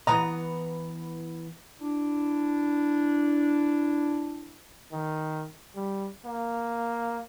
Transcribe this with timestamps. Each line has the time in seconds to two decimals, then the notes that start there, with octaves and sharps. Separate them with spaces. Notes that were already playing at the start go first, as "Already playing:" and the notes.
0.07 E3 B3 D#5 A#5
1.79 D4 E4
4.92 D#3
5.75 G3
6.25 A#3